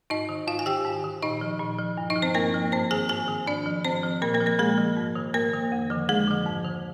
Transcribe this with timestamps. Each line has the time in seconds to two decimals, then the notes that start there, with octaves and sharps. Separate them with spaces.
0.10 G#2 D#4 D#5
0.29 D#3
0.48 G#2 F4 F5
0.59 G#5
0.66 D#3 G4 G5
0.85 G#2
1.04 D#3
1.22 A#2 D#4 D#5
1.41 F3
1.60 A#2
1.79 F3
1.98 G2
2.10 D#4 D#5
2.16 F3
2.22 C4 C5
2.34 G2 A#3 A#4
2.54 F3
2.72 G#2 C4 C5
2.91 D#3 G#4 G#5
3.09 G#2 G#4 G#5
3.28 D#3
3.47 G#2 D4 D5
3.66 F3
3.85 G#2 C4 C5
4.03 F3
4.22 A#2 A#3 A#4
4.34 A#3 A#4
4.40 F3
4.46 A#3 A#4
4.59 A#2 G#3 G#4
4.78 F3
4.97 G#2
5.16 D#3
5.34 G#2 A#3 A#4
5.53 D#3
5.72 F2
5.90 D3 F3
6.09 F2 G#3 G#4
6.28 D3 F3
6.46 G#2
6.65 D#3